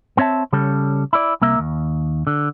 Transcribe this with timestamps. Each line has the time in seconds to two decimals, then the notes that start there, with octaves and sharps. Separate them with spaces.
0.17 B3 C4 C#5 E5 A5
0.53 C#3 G3 C#4 A4
1.13 E4 D5
1.42 C2 A#3 E5
1.59 D#2
2.27 D3